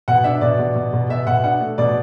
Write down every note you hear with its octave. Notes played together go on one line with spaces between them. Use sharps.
B2 F#5
D4 E5
B2 D5
B2
B2
B2
B2 E5
B2 F#5
D4 F#5
A3
B2 D5